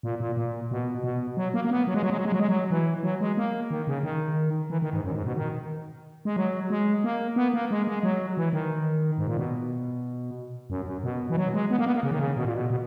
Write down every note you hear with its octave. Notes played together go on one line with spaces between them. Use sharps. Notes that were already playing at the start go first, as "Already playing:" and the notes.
A#2
A#2
A#2
B2
B2
F#3
A#3
A#3
B3
F#3
G#3
F#3
G#3
F#3
G#3
F#3
G#3
F#3
E3
F#3
G#3
A#3
D#3
C#3
D#3
E3
D#3
G#2
F#2
G#2
B2
D#3
G#3
F#3
G#3
A#3
B3
A#3
G#3
G#3
F#3
E3
D#3
G#2
A#2
B2
F#2
F#2
B2
E3
F#3
G#3
B3
A#3
B3
A#3
C#3
D#3
C#3
B2
A#2
B2
B2